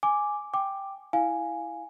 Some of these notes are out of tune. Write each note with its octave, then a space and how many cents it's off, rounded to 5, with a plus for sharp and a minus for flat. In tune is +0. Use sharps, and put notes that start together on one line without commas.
G#5 +0 D6 +0
G5 +0 D6 +10
E4 +0 F5 +0 G#5 +0